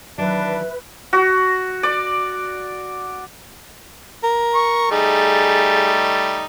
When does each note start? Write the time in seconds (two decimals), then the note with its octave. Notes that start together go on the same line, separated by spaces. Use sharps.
0.18 D#3 E3 F#3 D4 B4 E5
1.13 F#4
1.83 D5
4.23 A#4
4.54 C#6
4.91 G3 A3 D#4 G#4